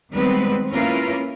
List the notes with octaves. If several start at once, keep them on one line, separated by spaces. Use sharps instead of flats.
D#3 G3 G#3 B3 C4 B4
A#3 C#4 E4 F4 A#4 B4